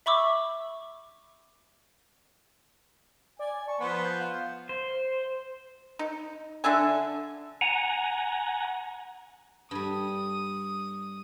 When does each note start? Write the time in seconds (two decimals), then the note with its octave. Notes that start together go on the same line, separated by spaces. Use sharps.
0.06 E5 B5 C#6 D6 E6
3.39 D5 G#5
3.68 A5 C#6
3.80 F3 B3 C5 B6
4.05 G6
4.21 F5
4.69 C5
5.99 D#4
6.64 D3 D4 E5 G#5
7.61 F#5 G#5 A#5
9.71 G2 G3 D#6